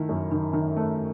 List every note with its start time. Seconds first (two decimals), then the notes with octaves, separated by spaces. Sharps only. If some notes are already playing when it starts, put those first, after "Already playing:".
Already playing: D#3 A3 E4
0.09 F#2
0.31 D#3
0.53 D#3
0.77 A3